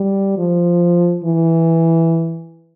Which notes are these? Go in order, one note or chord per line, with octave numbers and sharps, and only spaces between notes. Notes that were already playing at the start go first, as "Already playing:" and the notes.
Already playing: G3
F3
E3